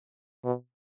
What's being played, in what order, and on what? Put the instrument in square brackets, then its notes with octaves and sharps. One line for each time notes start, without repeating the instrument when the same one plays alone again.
[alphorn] B2